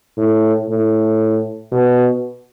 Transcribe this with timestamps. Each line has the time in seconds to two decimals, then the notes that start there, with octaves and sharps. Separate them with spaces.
0.17 A2
0.69 A2
1.72 B2